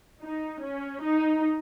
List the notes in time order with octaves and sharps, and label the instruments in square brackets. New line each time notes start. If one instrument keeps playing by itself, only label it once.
[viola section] D#4
C#4
D#4